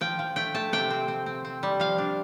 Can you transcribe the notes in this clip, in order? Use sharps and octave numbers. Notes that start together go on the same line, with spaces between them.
F3 G5
F3
A3 G5
A3 A5
C3 G5
C4
C4
C4
C4
G3
F3 F5
D4